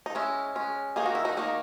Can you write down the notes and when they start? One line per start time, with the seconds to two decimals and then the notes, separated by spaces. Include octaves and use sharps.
0.06 D#4
0.15 G#3 C#4 E4
0.55 G#3 C#4
0.96 D#3 A#3 D#4 G#4
1.06 F#4
1.15 E4
1.25 D#4 F#4
1.37 D#3 A#3 D#4